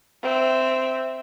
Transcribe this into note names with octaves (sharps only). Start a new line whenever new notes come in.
C4 E5